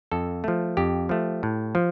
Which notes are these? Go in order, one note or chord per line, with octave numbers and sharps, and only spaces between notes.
F2 A4
F3 A3
F2 G4
F3 A3
A2
F3